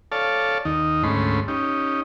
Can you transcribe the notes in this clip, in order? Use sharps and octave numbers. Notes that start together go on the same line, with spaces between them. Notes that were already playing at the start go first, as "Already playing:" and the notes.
A4 C#5 D5 F5 A5
D#2 D#3 D#4
D2 G#2 A3 C#4 B5 C6
C#4 D#4 G4